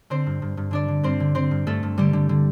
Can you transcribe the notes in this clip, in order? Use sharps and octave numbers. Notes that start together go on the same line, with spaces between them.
D3 C4 C5
G2
G2
G2
D3 D4 D5
D3
G2 C4 C5
D3
D3 C4 C5
G2
G2 A3 A4
G2
D3 G3 G4
D3
D3